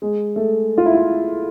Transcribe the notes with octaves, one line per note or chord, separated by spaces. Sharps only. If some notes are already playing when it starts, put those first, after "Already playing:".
G#3
A3
F4
E4
F4